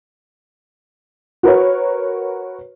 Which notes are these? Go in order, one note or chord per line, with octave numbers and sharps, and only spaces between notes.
F#4 A#4 B4 C#5